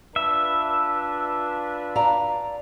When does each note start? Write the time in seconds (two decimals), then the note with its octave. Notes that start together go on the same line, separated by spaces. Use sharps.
0.16 D4 F4 B4 E5
1.96 D5 F5 A#5